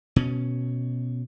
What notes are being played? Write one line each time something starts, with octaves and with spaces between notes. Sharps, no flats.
B2 C#4